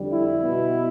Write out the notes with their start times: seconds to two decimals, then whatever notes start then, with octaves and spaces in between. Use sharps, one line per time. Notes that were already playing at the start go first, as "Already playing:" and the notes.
Already playing: F2 D3 G3
0.13 E4
0.43 B2 B3